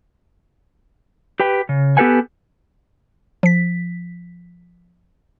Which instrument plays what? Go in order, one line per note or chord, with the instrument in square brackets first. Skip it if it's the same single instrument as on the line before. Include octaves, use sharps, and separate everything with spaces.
[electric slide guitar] G4 B4 G5
C#3
B3 G4 A4 B4 F#5 G#5
[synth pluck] F3 B6